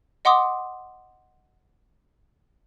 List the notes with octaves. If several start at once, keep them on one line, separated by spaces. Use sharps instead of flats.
D#5 F#5 C6 D6 D#6